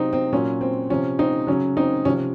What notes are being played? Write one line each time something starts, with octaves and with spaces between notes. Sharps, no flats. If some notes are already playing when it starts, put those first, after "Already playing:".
Already playing: C3 F#3 C4 D#4
C4
A#2 F#3 C#4
C4
C3 F3 C#4
C4 D#4
C#3 F#3 C#4
C4 D#4
C3 F3 C#4